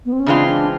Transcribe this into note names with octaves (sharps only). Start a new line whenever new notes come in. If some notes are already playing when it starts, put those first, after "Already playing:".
B3
C4
C#4
C#3 E3 G#3 C4 D4 F4
D4